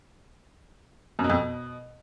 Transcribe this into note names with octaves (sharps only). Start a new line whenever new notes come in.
F#2
B2
F2
B2